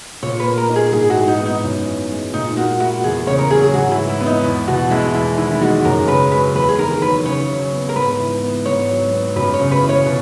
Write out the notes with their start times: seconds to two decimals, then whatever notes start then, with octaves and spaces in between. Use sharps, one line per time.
0.23 A#2 C#5
0.40 B4
0.45 A#3
0.57 A#4
0.69 D#4
0.76 G#4
0.93 G#2 G#4
1.10 F#4
1.16 E3
1.28 D#4
1.40 B3
1.46 D#4
1.63 F#2
1.87 E3
2.10 G#3
2.33 A#2 D#4
2.56 A#3 F#4
2.80 E4 F#4
3.04 E2 G#4
3.27 C#3 C#5
3.38 A#4
3.50 F#3 G#4
3.63 G#4
3.74 G#2 F#4
3.91 E4
3.97 E3
4.09 E4
4.20 B3
4.26 D#4
4.44 E2 E4
4.67 B2 F#4
4.90 G#3 E4
5.14 E2 E4
5.37 D#3 E4
5.51 E4
5.61 G#3 F#4
5.85 F#2 A#4
6.08 C#3 B4
6.32 F#3 B4
6.54 E2 B4
6.69 G#4
6.79 D#3 A#4
7.02 F#3 B4
7.25 C#3 C#5
7.49 F#3
7.73 B3
7.89 A#4
7.95 G#2 B4
8.20 E3
8.43 B3
8.66 G#2 C#5
8.89 F#3
9.13 B3
9.36 F#2 B4
9.54 C#5
9.60 C#3
9.71 B4
9.83 E3
9.89 C#5
10.06 B2